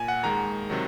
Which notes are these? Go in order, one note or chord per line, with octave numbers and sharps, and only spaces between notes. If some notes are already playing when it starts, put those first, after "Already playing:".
Already playing: A#2 G#5
F#5
D#2 D#3 G#3 A#5
C3 D#3 F#3